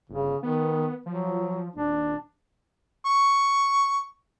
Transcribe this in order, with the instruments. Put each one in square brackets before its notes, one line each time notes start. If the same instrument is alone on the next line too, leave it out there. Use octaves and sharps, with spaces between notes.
[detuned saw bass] G1 [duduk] C#3
[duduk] D#3 [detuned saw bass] B3
[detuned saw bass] F3 [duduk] F#3
[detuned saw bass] D#1 [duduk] D4
[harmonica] C#6